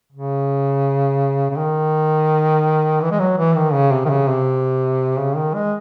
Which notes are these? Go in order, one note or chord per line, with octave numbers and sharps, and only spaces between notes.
C#3
C#3
D#3
E3
G#3
F#3
E3
D#3
C#3
C3
D#3
C#3
C3
C#3
D#3
G#3